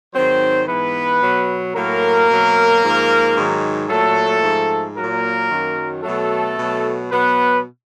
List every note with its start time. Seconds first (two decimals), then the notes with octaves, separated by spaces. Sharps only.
0.14 G#2 D#3 F#3 C4 C5
0.67 G#2 E3 B3 B4
1.22 B2 F#3
1.75 A2 F#3 A#3 A#4
2.29 B2 F#3
2.82 G#2 F3
3.35 G#2 D#3 F#3
3.89 A#2 F#3 A3 A4
4.43 G#2 F3
4.96 A#2 F#3 A#3 A#4
5.50 F#2 D#3 F#3
6.03 B2 F#3 A3 A4
6.58 B2 F#3
7.11 B2 F#3 B3 B4